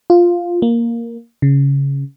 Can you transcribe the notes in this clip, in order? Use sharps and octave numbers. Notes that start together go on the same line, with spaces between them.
F4
A#3
C#3